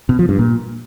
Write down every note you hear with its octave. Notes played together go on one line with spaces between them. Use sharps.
B2
F3
G2
A#2